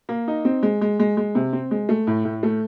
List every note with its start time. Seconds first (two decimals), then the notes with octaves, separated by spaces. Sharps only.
0.09 A#3
0.28 D#4
0.45 C4
0.63 G#3
0.81 G#3
1.00 G#3
1.17 G#3
1.35 C3
1.53 C4
1.71 G#3
1.89 A3
2.07 A2
2.25 A2
2.43 A3